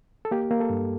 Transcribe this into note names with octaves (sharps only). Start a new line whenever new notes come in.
A4
A#3 G4
A#3
A4
G2